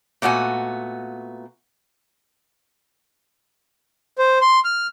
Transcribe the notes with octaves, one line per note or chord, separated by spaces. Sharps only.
A#2 A3 B3 F#4 G#5
C5
C6
F6